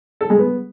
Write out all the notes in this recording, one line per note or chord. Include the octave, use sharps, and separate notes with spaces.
A4
G#3
B3